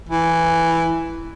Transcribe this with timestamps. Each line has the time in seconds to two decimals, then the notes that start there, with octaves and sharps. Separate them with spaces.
0.09 E3